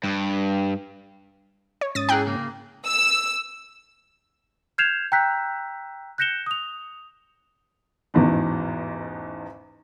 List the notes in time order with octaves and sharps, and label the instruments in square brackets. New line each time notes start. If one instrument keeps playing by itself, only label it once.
[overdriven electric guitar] G2
[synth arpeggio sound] C#5
[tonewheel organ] G#2 C#4 [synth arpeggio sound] D#6 A6
[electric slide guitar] E4 G#4 [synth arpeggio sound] G5 A#5 F#6
[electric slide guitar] C#3 A#3
[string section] E6
[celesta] F6 G6 G#6 C7 E7 F7
G5 A#5 E6 F#6 G6 B6
F#6 G6 A#6 C#7 E7 G7
D#6 F7
[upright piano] A1 E2 G#2 B2